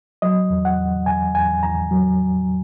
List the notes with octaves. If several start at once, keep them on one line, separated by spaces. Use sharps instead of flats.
F#3 D#5
E2
F#5
E2
E2 G#5
E2 G#5
E2 A#5
F#3